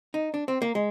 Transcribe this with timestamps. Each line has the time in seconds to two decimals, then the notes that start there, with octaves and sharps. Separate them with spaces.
0.14 D#4
0.34 D4
0.48 C4
0.62 A#3
0.75 G#3